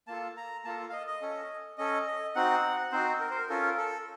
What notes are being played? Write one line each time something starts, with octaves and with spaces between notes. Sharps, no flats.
A#3 F4 A4 A5
A#5
A#3 F4 A4 A5
F5
D#5
D#5
C#4 A4
C#4 A4 D#5
D#5
C4 D#4 F#4 F#5
C4 D#4 F#4 C5
A#4
C5
A#4
C#4 F4 A4 A#4
A4